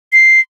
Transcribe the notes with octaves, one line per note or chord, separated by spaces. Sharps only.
C7